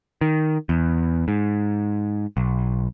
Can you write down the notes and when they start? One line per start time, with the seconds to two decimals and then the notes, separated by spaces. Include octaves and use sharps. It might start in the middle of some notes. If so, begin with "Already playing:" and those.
0.21 D#3
0.69 E2
1.28 G#2
2.37 B1